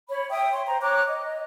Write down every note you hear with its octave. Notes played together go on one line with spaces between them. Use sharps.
C#5 B5
E5 G5 D#6
C#5 C6
C5 G5 A#5
C#5 A#5 D6 F#6
D#5